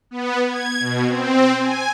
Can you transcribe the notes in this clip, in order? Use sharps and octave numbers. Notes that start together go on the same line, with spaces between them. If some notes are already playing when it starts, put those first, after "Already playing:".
B3
G#6
B2
C4
G#5